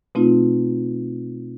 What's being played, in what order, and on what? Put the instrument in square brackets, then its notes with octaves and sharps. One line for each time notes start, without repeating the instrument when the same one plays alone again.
[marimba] B2 A3 C4 D#4 F4